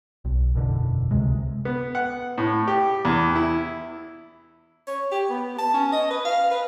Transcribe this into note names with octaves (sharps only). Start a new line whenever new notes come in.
B1
E1 F#2 B2 D3
C#2 C3 G#3
B3
F#5
A2
G4
E2
E4
C#5
G4
B3
A5
C#4
D#5
B4
F5
B4